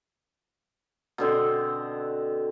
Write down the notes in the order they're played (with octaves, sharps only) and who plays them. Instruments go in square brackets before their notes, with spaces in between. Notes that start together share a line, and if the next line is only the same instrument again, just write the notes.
[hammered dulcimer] B2 D3 C4